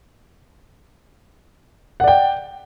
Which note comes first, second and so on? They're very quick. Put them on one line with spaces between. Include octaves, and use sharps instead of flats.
F#5 D5 G5